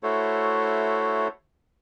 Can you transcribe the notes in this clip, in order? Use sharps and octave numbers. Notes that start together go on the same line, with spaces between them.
A3 E4 F#4 A4 C5 C#5